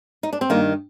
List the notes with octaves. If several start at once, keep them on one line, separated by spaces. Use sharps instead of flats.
D#4
D4
C4
G2 D#3 A#3